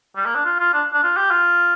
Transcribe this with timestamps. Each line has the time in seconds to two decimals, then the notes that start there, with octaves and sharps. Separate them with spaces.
0.16 G3
0.26 A#3
0.35 D4
0.45 F4
0.59 F4
0.73 D4
0.93 D4
1.03 F4
1.17 G4
1.31 F4